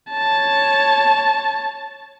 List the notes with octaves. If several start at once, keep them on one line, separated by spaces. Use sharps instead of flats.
C#5 A5